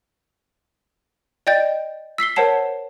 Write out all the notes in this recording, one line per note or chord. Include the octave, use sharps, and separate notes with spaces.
D5 D#5 G5 G6 A6
E6 B6 C7 G7
A#4 C5 C#5 F#5 A5 C7